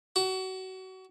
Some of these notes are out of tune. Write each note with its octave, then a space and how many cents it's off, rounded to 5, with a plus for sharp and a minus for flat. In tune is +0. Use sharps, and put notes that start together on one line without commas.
F#4 +30